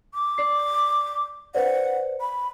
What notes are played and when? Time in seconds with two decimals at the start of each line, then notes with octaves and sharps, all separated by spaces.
0.14 D6
0.38 D5 C7
1.55 B4 C5 D5 F#5
2.21 B5